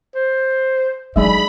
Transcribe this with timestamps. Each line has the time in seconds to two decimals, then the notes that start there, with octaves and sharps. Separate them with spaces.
0.16 C5
1.16 F#3 G#3 D4 D#4 D#5 E5 B5